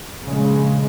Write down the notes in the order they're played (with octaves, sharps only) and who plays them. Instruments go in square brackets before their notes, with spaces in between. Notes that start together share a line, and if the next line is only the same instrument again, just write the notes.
[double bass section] A#1 C#3 G#3